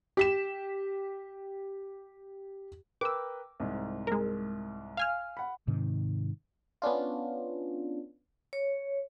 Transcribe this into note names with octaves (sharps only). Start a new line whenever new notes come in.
G4 B6 E7
A#4 B4 G5 D6 E6
C2 G#2
G#3 A#4
F5 G#5 F6
F#5 B5
G#2 C3 D#3
B3 C#4 D4 F4
C#5